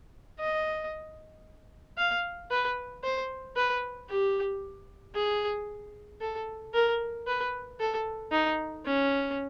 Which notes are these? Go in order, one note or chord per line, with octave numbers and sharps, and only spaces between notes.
D#5
F5
B4
C5
B4
G4
G#4
A4
A#4
B4
A4
D#4
C#4